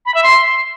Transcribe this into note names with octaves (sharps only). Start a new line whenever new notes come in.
B5
E5
C6